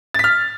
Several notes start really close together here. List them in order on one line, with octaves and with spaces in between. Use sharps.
A6 B6 F6